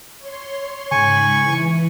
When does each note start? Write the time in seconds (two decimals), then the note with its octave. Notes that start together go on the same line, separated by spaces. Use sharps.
0.18 C#5 C6
0.91 G#2 C#3 G#5 B5 C#6
1.41 E3